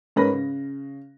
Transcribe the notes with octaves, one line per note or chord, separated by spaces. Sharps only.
G#2 C#4 A#4 B4 B5 A#6
C#3